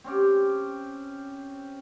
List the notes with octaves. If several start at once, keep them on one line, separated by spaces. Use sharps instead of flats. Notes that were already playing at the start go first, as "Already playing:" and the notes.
C4 C#4 G4